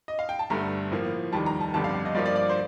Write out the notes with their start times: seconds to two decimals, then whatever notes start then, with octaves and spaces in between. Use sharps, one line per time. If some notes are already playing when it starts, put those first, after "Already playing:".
0.08 D#5
0.19 F5
0.29 G5
0.39 A5
0.50 G1 G2 D3 A3 A#5
0.92 A2 F3 A#3 F4
1.32 F1 D#2 D#3 G3 A5
1.46 A#5
1.60 A5
1.74 G1 F2 D3 G3 D4 A5
1.84 F5
1.94 F5
2.05 D#5
2.15 G2 F3 A#3 F4 D5
2.25 D5
2.36 D5
2.49 C5